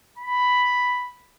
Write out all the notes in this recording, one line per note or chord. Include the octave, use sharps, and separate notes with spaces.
B5